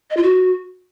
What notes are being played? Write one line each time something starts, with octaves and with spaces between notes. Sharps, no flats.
D#5
F4
F#4